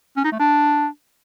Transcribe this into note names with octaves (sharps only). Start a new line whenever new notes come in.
C#4
D#4
A3
D4